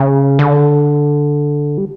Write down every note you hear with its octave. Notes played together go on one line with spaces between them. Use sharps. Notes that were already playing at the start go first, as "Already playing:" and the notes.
Already playing: C#3
D3
G3